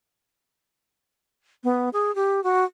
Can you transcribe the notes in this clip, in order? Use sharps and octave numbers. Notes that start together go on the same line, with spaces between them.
B3
G#4
G4
F#4